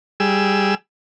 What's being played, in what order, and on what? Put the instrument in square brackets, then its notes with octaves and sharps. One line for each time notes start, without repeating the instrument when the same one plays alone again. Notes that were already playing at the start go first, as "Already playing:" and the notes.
[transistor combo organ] G3 G#4 E6